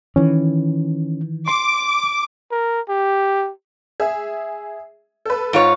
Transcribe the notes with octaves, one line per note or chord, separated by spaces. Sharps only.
D#3 E3 C#4
C6 D6
A#4
G4
G#4 E5
A4 B4
G#2 F4 C#5